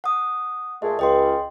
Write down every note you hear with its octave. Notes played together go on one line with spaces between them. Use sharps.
F#5 D#6
A#2 G#3 A3 D#5
C#2 D#5 G5 C6